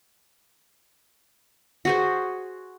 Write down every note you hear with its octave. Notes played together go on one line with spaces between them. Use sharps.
F#4 G#4 C5